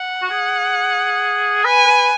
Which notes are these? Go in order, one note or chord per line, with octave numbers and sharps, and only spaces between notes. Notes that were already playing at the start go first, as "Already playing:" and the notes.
Already playing: F#5
F#4
G#4
B4 G#5
B4